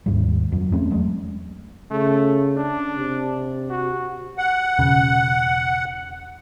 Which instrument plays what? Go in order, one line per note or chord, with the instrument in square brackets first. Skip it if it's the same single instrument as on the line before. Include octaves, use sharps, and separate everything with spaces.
[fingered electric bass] D#2 G#2 G3
F2 F#3
E2 A3 C4 C#4
F#3 G#3 A3
[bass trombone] C#3 [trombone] A3
[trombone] D4
[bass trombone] C3
[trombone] F#4
[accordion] F#5
[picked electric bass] E1 C#3